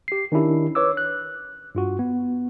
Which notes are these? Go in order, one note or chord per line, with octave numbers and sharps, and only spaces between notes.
G4 C7
D#3 C#4 D4 E4 G4
B4 C#5 D6 E6
F#6
G2 F4 F#4
B3